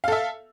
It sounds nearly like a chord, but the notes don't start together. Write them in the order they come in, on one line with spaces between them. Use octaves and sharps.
F5 A4 E5